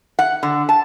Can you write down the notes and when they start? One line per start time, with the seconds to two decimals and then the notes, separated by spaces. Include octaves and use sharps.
0.19 F#5
0.43 D3
0.69 A5